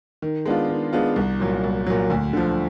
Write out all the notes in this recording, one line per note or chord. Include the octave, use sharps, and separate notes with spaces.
D#3
G#3 B3 D4 F4
D#3
G#3 B3 D4 F4
C2
A#2 F#3
C2
A#2 F#3
D2
D3 F3